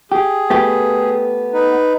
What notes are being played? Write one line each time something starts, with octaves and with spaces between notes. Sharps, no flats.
G4 G#4
A3 B3 G4
D#4 B4